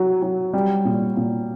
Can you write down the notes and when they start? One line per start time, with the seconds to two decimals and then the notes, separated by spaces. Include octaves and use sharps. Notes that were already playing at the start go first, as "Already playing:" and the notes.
Already playing: F#3
0.22 F#3
0.53 G3
0.85 A#2
1.17 A#2